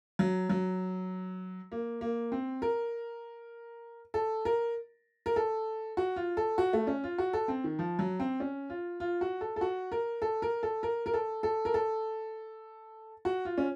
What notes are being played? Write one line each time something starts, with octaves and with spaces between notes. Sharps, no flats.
F#3
F#3
A#3
A#3
C4
A#4
A4
A#4
A#4
A4
F#4
F4
A4
F#4
A3
C#4
F4
F#4
A4
C4
D#3
F3
F#3
C4
C#4
F4
F4
F#4
A4
A4
F#4
A#4
A4
A#4
A4
A#4
A#4
A4
A4
A#4
A4
F#4
F4
C#4